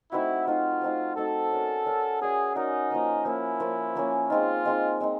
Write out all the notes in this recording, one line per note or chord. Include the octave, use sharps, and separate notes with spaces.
A3 C4 D#4 E4 F#4
A3 C4 D#4 F4 F#4
A3 C4 D#4 F#4
A3 C4 D#4 F#4 A4
C#4 F#4 A#4 D5
C#4 F#4 A#4 D5
C#4 F#4 G#4 A#4 D5
C#4 D#4 F#4 A#4 D5
F3 A#3 C#4
F3 A#3 C#4 E4
F3 A#3 C#4
F3 A#3 C#4
G#3 C4 D#4 F4
G#3 C4 D#4
G#3 C4 D#4